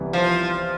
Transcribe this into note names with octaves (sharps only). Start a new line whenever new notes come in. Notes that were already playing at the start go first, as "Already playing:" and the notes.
Already playing: C2 C3 E3 G3 B3
F3